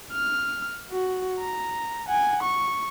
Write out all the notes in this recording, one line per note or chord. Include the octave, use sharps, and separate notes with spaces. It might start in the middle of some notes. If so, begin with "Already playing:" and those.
F6
F#4
A#5
F#5 G#5
C#6